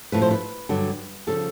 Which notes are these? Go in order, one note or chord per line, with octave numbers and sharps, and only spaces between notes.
A2 F3 B4
C5
B4
G2 D3 F#3
C#3 F3 A4